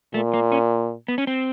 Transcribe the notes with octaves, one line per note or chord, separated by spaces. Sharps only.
A#2 A3
A#3
C#4
B3
C#4
C4